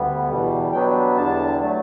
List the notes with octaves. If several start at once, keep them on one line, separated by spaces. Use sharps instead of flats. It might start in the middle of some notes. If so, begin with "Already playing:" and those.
Already playing: D2 D3 G3 B3
E2 B2 G3
B2 F#3 B3 D4 G5
E2 D3 G3 D4 A5
F#3 A3